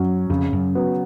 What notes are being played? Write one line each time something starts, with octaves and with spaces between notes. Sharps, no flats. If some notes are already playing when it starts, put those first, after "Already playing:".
Already playing: F#2 F#3 C#4
F2 C#3
F#2
F#3 B3